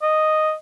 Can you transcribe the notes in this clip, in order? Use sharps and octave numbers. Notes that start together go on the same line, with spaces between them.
D#5